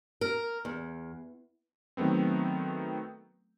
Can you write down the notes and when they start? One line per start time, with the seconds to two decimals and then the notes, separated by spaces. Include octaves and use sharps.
0.21 A#4
0.65 E2
1.97 D#3 F#3 A3 B3 C4